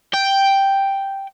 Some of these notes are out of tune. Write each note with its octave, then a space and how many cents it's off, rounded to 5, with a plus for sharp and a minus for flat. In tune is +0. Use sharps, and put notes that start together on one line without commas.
G5 +0